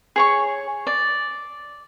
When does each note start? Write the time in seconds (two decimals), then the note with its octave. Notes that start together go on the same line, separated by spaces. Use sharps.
0.16 G#4 C#5 C#6
0.87 D5